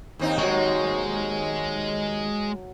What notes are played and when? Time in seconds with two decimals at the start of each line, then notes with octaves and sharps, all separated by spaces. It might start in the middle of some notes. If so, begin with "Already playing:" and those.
0.19 D#2 C4 D#4
0.38 F#3 G#3 C#6